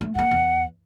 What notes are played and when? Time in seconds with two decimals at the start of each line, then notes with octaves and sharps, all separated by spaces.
0.01 A3
0.15 G2 A#3 F#5
0.31 E2